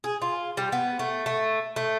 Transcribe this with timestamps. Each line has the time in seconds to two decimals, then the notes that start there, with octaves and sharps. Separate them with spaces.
0.04 G#4
0.22 F4
0.57 G3
0.72 B3
0.99 A3
1.26 A3
1.76 A3